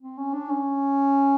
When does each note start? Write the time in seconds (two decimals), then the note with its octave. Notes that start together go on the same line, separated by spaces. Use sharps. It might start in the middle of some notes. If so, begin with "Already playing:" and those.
0.02 C4
0.18 C#4
0.34 D4
0.49 C#4